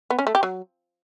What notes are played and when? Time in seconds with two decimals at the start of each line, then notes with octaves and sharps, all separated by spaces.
0.10 B3
0.19 C#4
0.27 A3
0.35 G4
0.43 F#3